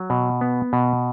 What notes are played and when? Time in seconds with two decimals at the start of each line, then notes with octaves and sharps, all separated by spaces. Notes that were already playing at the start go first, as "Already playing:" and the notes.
Already playing: F#3
0.10 B2
0.41 B3
0.73 B2